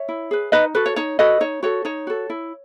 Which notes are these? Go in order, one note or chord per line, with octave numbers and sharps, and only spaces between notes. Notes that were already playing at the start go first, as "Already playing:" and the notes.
Already playing: C#5 E5
E4
G#4 B4
D#4 B4 D#5
F#4 A4 B4
C#5
D#4 C#5
F#4 A4 B4 D#5
D#4 C#5
F#4 A4 C#5
D#4 C#5
F#4 A4
E4